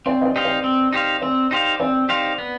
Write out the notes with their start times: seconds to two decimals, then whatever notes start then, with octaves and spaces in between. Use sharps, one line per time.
0.06 C4 D5
0.21 D#5
0.25 D5
0.36 D#4 G4 C5 F5
0.45 D5
0.64 C4
0.93 D#4 G4 C5 F5
1.22 C4 D5
1.51 D#4 G4 C5 F5
1.80 C4 D5
2.09 D#4 G4 C5 F5
2.38 B3